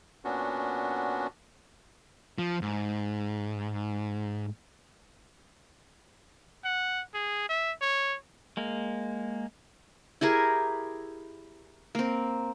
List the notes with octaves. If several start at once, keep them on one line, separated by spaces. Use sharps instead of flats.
A#2 B3 C#4 D4 F#4
F3
G#2
F#5
G#4
E5
C#5
G#3 A#3
E4 G4 G#4 A#4
A#3 C4